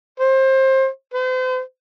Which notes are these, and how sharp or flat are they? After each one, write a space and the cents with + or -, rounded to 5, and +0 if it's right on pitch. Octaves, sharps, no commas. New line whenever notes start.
C5 +25
C5 -40